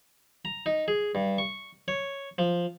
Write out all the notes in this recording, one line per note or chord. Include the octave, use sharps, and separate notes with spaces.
A#5
D#4
G#4
G2
C#6
C#5
F3